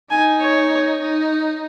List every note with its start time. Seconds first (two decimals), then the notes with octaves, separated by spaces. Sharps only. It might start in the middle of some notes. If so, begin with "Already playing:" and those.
0.11 D#4 G#5
0.41 C#5
1.01 D#4